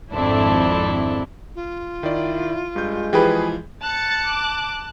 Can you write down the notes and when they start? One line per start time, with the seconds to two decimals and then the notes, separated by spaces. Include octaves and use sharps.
0.13 G#1 F2 C4 D4 E4 A4
1.55 F4
2.03 D#3 E4 D5
2.76 G2 G#3 G6
3.13 E3 F3 G4 G#4 B4
3.82 A5 F#6 A6 C#7
4.26 D6